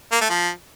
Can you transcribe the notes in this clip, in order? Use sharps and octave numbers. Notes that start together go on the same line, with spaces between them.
A#3
A3
F3